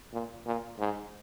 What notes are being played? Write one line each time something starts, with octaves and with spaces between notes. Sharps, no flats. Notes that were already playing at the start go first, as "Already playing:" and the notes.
A#2
A#2
G#2